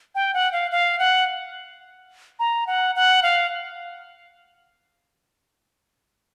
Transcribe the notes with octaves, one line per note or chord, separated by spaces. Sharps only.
G5
F#5
F5
F5
F#5
A#5
F#5
F#5
F5